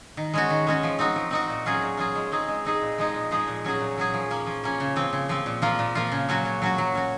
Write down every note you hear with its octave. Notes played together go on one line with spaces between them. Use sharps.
D#3
G#3 C#4 F#4
D#3
G#3 C#4 F#4
F3
C4 D#4 F#4
F3
C4 D#4 F#4
A#2
F#3 C#4 F4 G#4
A#2
F#3 C#4 F4 G#4
G#3
C4 D#4 G#4
G#3
C4 D#4 G#4
A#2
F3 G#3 D#4 G#4
A#2
F3 G#3 D#4 G#4
A#2
F#3 C#4 G#4
A#2
F#3 C#4 G#4
F3
A#3 C#4
F3
A#3 C#4
C#3
F3 C4
C#3
F3 C4
A#2
F3 A#3 F4
A#2
F3 A#3 F4
C#3
F#3 C#4 F#4
C#3
F#3 C#4 F#4
F#3
C#4 F#4